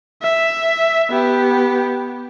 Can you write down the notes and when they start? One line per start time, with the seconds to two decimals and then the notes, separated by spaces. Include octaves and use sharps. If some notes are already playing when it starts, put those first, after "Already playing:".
0.23 E5
1.10 B3 G4